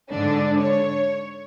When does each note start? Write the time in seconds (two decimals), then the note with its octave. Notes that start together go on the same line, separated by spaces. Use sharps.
0.11 G#2 D3 D4
0.61 C#5